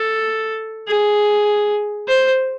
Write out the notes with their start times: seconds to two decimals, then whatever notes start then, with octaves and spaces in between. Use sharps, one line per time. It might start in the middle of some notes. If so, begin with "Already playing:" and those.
Already playing: A4
0.88 G#4
2.08 C5